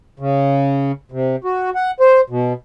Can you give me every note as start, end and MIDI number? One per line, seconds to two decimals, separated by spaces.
0.20 0.92 49
1.12 1.36 48
1.44 1.70 66
1.75 1.91 78
2.00 2.21 72
2.30 2.53 47